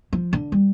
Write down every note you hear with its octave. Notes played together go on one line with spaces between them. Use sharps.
F3
D3
G3